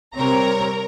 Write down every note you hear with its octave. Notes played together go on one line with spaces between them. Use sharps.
C3 G3 C4 A#4 C#5 A#5